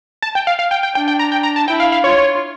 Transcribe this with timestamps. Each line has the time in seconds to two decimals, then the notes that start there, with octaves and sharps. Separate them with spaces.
0.22 A5
0.35 G5
0.47 F5
0.59 F5
0.71 G5
0.83 G5
0.95 D4 G5
1.08 G5
1.19 A#5
1.32 G5
1.43 A#5
1.56 A5
1.68 E4 G5
1.80 F5
1.92 F5
2.04 F4 C#5